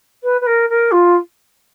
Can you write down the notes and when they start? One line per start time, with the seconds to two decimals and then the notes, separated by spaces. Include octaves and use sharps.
0.23 B4
0.41 B4
0.46 A#4
0.69 A#4
0.91 F4